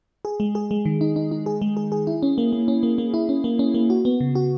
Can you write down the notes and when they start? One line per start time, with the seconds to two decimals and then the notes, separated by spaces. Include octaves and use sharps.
0.25 G#4
0.40 G#3
0.55 G#4
0.71 G#3
0.85 D#3
1.01 D#4
1.16 D#4
1.31 D#4
1.46 G#4
1.62 G#3
1.77 G#4
1.92 G#4
2.07 E4
2.23 C#4
2.38 A#3
2.53 A#3
2.68 C#4
2.83 A#3
2.98 A#3
3.14 E4
3.29 C#4
3.44 A#3
3.59 C#4
3.74 A#3
3.90 F#4
4.05 B3
4.20 C#3
4.35 F#4